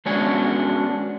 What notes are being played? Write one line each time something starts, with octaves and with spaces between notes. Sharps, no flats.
G#3 B3 C#4 D4 F#4 G#5